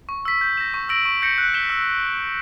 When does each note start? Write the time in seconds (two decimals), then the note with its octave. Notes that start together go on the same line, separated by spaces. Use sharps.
0.09 C#6
0.25 E6 B6
0.41 G6
0.57 A#6 E7
0.74 C#6
0.89 E6 A#6 D7 F#7
1.05 C#6
1.22 G6 A#6 C#7
1.38 F#6
1.54 B6 E7 G7
1.70 E6